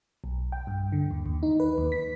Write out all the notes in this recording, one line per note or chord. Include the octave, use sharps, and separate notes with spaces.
B1
G5
G2
D3
D#2
D#2
D#4
B4
D#2
B6